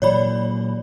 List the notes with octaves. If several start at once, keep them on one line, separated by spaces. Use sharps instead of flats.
A#2 E3 F#3 C#5 D5 B5